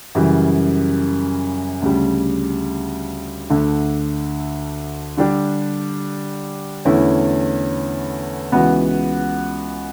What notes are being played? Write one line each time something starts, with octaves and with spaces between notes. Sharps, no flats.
F#2 C#3 E3 G3
D2 C#3 G3
D2 D3 A3
D3 G3 D4 G4
E2 D3 A3 C#4 E4
C#2 C#3 E3 B3 F#4